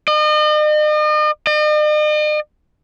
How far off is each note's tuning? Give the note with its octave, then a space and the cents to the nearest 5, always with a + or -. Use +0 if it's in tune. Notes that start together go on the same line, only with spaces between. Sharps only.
D#5 -40
D#5 -45